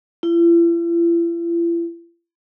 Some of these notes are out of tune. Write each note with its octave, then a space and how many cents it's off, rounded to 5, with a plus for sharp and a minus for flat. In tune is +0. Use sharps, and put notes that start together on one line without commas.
E4 +45